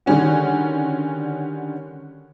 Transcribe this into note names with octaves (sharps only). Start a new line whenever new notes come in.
D3 D#3 G3 C#4 F#4